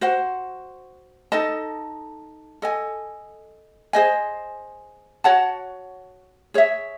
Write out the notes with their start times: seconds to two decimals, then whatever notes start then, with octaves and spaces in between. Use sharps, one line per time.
0.01 F#4 C5 F#5
1.32 D#4 A4 D#5 A5
2.62 A4 D#5 G#5
3.93 G#4 C5 D#5 G#5
5.24 F#4 C#5 F#5 A5
6.54 G#4 C#5 E5